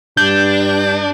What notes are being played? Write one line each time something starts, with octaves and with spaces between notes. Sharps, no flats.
G2 D4 G6